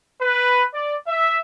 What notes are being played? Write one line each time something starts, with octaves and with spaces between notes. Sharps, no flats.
B4
D5
E5